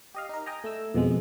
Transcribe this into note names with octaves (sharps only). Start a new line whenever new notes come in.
G4 D#5 F5
D#4 A#4
D#5 G5 G#5 A#5
A3 E6
F2 B2 F3 G#3